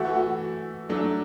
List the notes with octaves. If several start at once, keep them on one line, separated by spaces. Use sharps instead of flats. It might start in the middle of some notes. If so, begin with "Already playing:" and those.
Already playing: E3 A3 E4 F#4
F#4
F#3 A3 D4